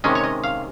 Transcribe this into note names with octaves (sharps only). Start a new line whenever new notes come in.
C3 D#3 G#3 C#4 D#5
C#5
D#5
F5